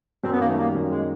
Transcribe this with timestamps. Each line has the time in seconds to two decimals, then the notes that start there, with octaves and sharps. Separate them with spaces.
0.24 F#2 C4
0.33 B3
0.40 D#3 A#3
0.49 A3
0.57 G3 A#3
0.75 F#2
0.91 G#3